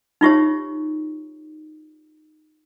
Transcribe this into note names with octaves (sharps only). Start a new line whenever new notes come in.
D#4 F4 G4 C#5